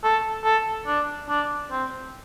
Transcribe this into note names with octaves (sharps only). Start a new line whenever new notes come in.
A4
A4
D4
D4
C4